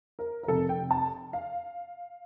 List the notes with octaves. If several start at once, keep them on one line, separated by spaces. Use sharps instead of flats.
A#4
A#4
F1 F2 C3 A4
G5
A5
F5